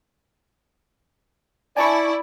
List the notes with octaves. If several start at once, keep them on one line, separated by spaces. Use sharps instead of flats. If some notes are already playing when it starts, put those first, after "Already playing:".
E4 D5 G#5 A5 C#6